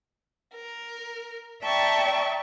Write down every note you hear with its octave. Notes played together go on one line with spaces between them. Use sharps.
A#4
D5 E5 G5 A5 A#5 C#6